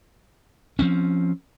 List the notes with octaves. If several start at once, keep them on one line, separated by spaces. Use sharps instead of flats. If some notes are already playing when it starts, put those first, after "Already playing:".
F3 C4 C#4